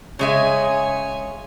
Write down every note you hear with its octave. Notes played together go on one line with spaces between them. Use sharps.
C#3 G#3 C#5 E5 G#5